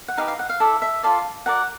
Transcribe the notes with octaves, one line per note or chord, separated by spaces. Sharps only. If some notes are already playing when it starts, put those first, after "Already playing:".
F#5
D#4 G4 B4 F5
F5
F#5
F5
E4 A4 D5 E5
E5
F4 A4 D5 F5
F#4 A#4 D5 F#5